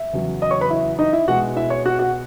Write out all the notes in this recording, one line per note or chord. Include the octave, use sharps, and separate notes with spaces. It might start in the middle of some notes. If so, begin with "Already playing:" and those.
Already playing: E5
E2 C#3 F#3
D#5 D#6
C#5 C#6
B4 B5
E4 E5
D#4 D#5
E4 E5
B2 G#3 F#4 F#5
E4 E5
C#5
F#4 F#5
F#4 F#5